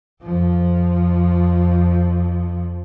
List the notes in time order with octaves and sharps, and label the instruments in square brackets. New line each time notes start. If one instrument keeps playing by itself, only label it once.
[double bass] F2 F3